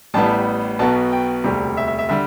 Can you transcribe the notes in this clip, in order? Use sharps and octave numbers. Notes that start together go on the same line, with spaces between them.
A1 A2 G3 B3 A5
B1 B2 B3 A5
G5
E1 D2 C3 G3
E5
E5
E5
D3 G3 E5